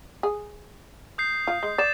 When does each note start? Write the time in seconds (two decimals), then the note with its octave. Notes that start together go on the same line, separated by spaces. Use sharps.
0.23 G#4
1.18 D#6 G6 C7
1.47 F4
1.63 G#3
1.78 D5 A6 E7